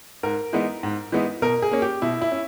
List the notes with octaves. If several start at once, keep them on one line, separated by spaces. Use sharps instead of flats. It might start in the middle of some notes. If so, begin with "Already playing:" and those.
G#2 A#4
E3 G#3 B3 D#4
G#2
E3 G#3 B3 D#4
B2 A#4
G#4
A#3 C#4
G4
B2 E4
E4
C#4